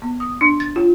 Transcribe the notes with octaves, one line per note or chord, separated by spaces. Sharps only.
B3
D#6
D4
A6
F4